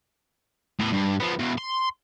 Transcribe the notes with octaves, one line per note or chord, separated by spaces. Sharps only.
A2 B3
G2
F3 B3
E2 B2
C6